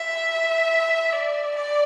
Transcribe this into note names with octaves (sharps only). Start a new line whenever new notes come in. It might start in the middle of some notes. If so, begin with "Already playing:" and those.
Already playing: E5
D5
D5